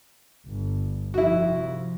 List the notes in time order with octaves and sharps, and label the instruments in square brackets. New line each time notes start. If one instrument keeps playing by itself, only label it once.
[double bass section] G1
[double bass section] F2 C3 F3 [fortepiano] E4 F#4